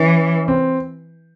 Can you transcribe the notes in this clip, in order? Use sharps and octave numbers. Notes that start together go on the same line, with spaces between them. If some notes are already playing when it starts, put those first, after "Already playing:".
Already playing: E3 C#4
C4